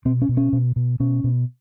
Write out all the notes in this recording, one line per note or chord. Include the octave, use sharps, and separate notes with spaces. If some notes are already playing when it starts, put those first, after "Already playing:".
B2 C4
C#4
B2
C#4
B2
B2
B2 C#4
B2